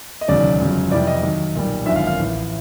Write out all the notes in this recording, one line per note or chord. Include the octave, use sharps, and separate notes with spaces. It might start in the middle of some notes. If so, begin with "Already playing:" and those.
D#5
E1 D#2 C#3 F#3 D5
G1 F2 C#3 F#3
F2 C3 E3 G3 D5
D#5
D#2 D#3 F#3
B1 A#2 G3
G#1 F#2 D3 F3 E5
F5
F5
A1 A2 F3